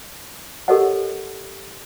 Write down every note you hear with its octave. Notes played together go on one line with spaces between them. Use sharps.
G4 A4 A#4 C#5 D#5 F#5